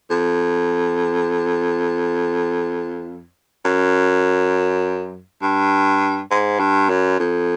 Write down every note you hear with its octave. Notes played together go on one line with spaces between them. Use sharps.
F2
F#2
G2
G#2
G2
F#2
F2